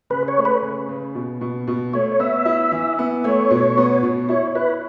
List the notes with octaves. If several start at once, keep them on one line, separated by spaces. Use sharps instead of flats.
C#3 B4
C#5
A3
B4
C#3
C#3
B2
B2
B2
A3 C#5
C#5
B3 E5
E4
E3
B3
A3 C#5
B2
B3
B2
E4 C#5
E4 B4